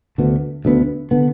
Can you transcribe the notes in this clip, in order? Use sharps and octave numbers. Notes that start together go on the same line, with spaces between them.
D2 D3 B3
D2 D3 B3
D3 B3